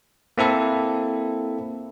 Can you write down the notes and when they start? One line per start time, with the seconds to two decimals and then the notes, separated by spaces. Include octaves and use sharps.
0.38 A#3 C4 E4 A4